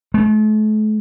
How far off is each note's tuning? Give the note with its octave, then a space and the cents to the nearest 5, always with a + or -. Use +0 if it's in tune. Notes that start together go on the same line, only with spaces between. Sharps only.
A3 -40